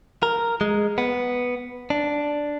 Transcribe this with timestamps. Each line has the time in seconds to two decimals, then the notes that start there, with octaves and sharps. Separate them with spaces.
0.23 A#4
0.61 G#3
0.98 B3
1.90 D4